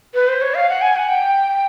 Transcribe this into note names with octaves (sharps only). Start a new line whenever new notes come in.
B4
C5
C#5
F5
F#5
G#5
F#5
G5